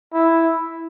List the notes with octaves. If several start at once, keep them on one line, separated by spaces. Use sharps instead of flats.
E4